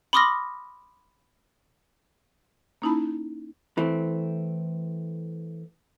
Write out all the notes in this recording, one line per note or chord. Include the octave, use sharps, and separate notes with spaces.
B5 C6 D6 D#6 F6 A#6
A#3 C#4 D#4 E4 A5 B5
E3 A3 C4